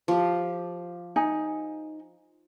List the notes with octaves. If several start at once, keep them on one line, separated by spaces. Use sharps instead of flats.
F3 G4
D#4 G#5